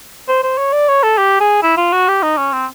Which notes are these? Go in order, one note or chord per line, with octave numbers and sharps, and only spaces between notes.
C5
C5
C#5
D5
C#5
A4
G4
G#4
E4
F4
F#4
G4
D#4
C#4
C4